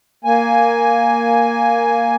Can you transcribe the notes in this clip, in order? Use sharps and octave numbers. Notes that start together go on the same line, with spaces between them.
A#3 G#5